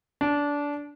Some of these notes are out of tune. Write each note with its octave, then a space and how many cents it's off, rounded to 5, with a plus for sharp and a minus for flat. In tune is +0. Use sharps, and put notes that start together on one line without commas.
D4 -20